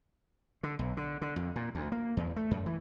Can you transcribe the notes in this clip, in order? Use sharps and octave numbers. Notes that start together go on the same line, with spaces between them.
D3
B1
D3
D3
F2
A#2
D2
A#3
E2
A3
F#2
E3